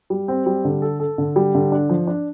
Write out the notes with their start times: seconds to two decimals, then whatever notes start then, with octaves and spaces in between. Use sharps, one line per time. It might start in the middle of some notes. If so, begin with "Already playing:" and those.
0.10 G3
0.28 C4
0.46 G3
0.65 D3
0.82 A4
1.00 A4
1.18 D3
1.36 G3
1.55 D3
1.72 D4
1.89 F3
2.07 D4